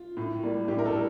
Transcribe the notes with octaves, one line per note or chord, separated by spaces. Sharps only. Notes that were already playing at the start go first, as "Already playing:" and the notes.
Already playing: F4
A2
G3 A#3
A2 G4
A#4
A4
G3